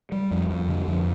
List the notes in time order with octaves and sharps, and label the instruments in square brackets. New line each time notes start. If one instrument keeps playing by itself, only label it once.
[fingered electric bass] G3
F2
F2
D3
F2